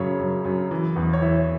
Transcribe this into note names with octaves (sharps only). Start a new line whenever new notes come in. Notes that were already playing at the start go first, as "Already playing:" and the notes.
Already playing: F#2 C#3 C#5
F#2
F#2
E3
E2
C#5
E3 E5